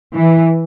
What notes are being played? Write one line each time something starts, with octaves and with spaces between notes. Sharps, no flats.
E3